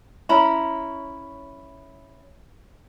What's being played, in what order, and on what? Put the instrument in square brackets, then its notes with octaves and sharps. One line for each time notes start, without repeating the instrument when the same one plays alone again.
[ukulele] C#4 E4 A#5 B5